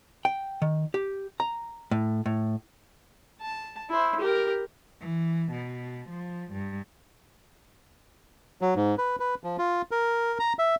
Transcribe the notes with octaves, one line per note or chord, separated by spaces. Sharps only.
G5
D#3
G4
A#5
A2
A2
A5
E4 C5
G4 A#4
E3
B2
F3
G2
F#3
G#2
B4
B4
F3
F4
A#4
A#5
E5